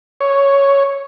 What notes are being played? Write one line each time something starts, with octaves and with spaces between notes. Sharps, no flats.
C#5